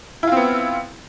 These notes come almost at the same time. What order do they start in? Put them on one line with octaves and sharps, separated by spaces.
E4 F4 C4 B3